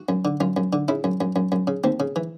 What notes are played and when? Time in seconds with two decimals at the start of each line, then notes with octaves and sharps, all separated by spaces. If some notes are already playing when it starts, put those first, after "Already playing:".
Already playing: F#4
0.09 F#2
0.25 D3
0.40 F#2 F4
0.57 F#2
0.73 D3
0.88 C#3 E4
1.04 F#2
1.21 F#2
1.36 F#2
1.52 F#2
1.67 C#3
1.84 D#2 C4
2.00 C#3
2.16 E3